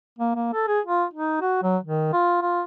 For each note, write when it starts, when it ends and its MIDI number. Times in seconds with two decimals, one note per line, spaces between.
0.19 0.33 58
0.36 0.49 58
0.53 0.66 69
0.68 0.80 68
0.86 1.05 65
1.14 1.41 63
1.41 1.61 66
1.63 1.78 54
1.84 2.12 51
2.13 2.37 65
2.42 2.63 65